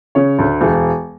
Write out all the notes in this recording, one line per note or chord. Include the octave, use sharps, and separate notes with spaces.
C#3 C#5
D2
E1